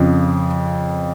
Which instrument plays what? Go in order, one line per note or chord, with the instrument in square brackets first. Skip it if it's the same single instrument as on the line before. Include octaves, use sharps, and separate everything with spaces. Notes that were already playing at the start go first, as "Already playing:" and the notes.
Already playing: [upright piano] F2 C#3 F3